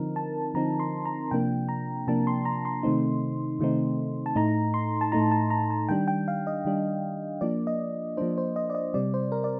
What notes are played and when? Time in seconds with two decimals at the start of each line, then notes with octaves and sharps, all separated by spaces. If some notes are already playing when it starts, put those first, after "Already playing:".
Already playing: D3 F3 C4 D#4 A#4
0.16 A5
0.54 D3 F3 C4 D#4 A#5
0.80 C6
1.05 A#5
1.31 C3 F3 A#3 D4 G5
1.69 A#5
2.07 C3 F3 A#3 D4 A5
2.27 C6
2.45 A#5
2.65 C6
2.83 C3 D#3 A3 C4 D#4
3.59 C3 D#3 A3 C4 D#4
4.26 A5
4.36 A2 A3 D#4 A#5
4.74 C6
5.01 A5
5.12 A2 A3 D#4 A#5
5.31 A5
5.50 A#5
5.70 A5
5.89 D#3 G3 D4 G5
6.08 G5
6.28 F5
6.47 D#5
6.65 D#3 G3 D4
7.41 F3 A#3 D4 D5
7.67 D#5
8.17 F3 A#3 D4 C5
8.38 C5
8.56 D#5
8.70 D5
8.75 D#5
8.94 C3 G3 C4 D5
9.14 C5
9.32 A#4
9.44 D5